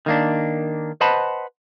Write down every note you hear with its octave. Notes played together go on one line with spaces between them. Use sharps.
D#3 A#3 D4
B4 C5 D#5 F#5 A5 B5